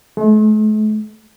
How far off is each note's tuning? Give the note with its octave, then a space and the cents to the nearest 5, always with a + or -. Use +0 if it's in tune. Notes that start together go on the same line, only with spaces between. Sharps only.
A3 -45